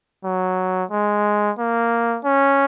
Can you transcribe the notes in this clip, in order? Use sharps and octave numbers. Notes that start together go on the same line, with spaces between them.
F#3
G#3
A#3
C#4